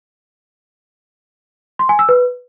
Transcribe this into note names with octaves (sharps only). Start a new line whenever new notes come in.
C6
G#5
E6
B4